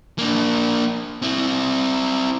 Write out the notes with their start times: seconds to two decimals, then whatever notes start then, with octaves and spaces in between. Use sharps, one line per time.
0.18 A#3 D4
1.22 C4 E4